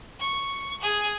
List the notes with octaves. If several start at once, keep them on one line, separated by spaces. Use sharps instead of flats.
C#6
G#4